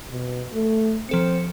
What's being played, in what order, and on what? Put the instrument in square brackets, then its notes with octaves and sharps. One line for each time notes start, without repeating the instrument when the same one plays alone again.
[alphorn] B2
A3
[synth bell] F3 A4 C#7 [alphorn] C4